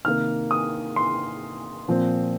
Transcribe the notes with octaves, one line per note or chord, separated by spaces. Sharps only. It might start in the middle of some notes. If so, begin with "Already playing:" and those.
C3 D#3 A#3 F6
D#6
C6
A#2 F3 C4